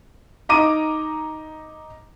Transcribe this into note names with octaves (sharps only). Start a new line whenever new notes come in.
D#4 A#5 D6 D#7